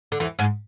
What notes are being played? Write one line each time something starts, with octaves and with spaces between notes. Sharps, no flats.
D3
E2 E3
G#2 G#3